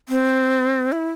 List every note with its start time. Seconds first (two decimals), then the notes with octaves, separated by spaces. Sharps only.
0.09 C4
0.92 E4